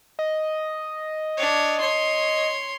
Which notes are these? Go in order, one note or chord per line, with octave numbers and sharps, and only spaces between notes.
D#5
D4 C#5
C#5 C6